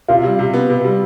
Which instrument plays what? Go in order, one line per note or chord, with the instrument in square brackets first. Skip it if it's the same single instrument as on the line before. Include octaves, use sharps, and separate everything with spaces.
[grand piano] C3 [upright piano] F4
[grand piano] G3
C3
B3
C3
G3